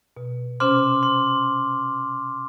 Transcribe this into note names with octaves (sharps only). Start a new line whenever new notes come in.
B2
C3 C#4 C5 C6 D6 F6
C6